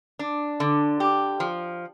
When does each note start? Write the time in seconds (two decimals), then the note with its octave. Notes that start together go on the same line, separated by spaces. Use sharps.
0.19 D4
0.60 D3
1.00 G4
1.40 F3